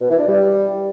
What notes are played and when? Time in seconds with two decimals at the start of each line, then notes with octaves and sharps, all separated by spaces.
0.01 B2
0.10 E3
0.18 D4
0.27 G3